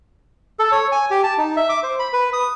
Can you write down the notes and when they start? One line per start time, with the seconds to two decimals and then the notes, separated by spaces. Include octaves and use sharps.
0.59 A4
0.72 C#5
0.92 G#5
1.11 G4
1.24 A5
1.38 D#4
1.56 E5
1.69 D6
1.83 C5
1.99 B5
2.13 B4
2.33 D#6